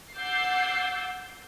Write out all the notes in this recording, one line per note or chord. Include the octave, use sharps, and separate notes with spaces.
F#5 D6 E6 G6 A6 C7